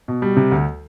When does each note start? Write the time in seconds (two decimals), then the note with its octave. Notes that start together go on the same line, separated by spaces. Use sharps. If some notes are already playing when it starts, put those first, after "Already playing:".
0.08 B2
0.22 G3
0.37 C3
0.52 D2